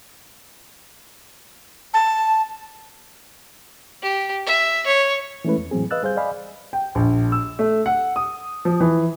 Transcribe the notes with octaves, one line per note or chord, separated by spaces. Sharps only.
A5
G4
E5
C#5
E3 G#3 A3 C#4 E4 B4
E2
A2 E3 F#3 C4 G#4
B4 D#5 F5 E6 F#6 A6
G3 G#4 C5 F5 G6
D5 D#5 F5 G#5 B5
G5
A#1
E6
A3
F#5
D#6
F3
E3